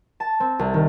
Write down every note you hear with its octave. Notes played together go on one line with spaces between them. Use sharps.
A5
C4
C2
D#3